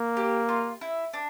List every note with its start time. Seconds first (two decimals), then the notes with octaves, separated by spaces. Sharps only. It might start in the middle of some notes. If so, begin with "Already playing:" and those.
Already playing: A#3
0.17 G4
0.49 F4
0.81 E4
1.13 D4